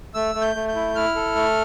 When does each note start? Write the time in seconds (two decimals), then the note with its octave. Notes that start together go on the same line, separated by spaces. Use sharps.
0.14 A3 E6
0.35 A3
0.41 G6
0.55 A3
0.68 G6
0.75 E4
0.95 E4 F6
1.15 A4
1.36 A3